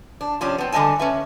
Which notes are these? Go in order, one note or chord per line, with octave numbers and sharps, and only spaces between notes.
D4
C3 F3 C#4 D4
B3 C4
D3 G3 D#5 G#5 A5
C#4 B4 E5